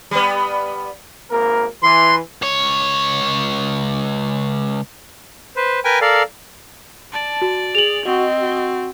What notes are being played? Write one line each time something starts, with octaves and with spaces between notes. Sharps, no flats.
G3 B3
G#1 A#3 A#4
E3 C6
C#2 C#5
B4 C5
A#4 B4 G5 G#5
A4 A#4 D5 F5
D5 A5
F#4
G#4 F7 F#7
C4 F#4 D#5
F#4